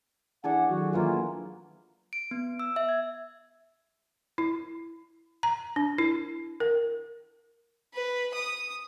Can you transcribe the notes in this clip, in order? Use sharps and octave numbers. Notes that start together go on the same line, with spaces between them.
D4 E4 G#4 A4 F#5
D#3 F#3 F#4
E3 F#3 A#3 F4 E5 F5
D7
B3
E6
E5
G#6
E4
A#5
D4
E4
A#4
B4
D#6